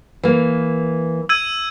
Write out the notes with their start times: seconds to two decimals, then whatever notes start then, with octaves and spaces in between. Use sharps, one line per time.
0.23 E3 A#3
1.29 E6 G#6 D#7